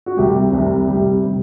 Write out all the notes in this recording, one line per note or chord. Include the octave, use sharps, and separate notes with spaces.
F#4
C2 C3 G3 G4
C2 C3 G3
C2 C3 G3 G4
C3 G3